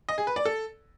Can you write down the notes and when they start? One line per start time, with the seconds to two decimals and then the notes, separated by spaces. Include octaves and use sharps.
0.09 D#5
0.18 G#4
0.27 B4
0.36 D5
0.45 A4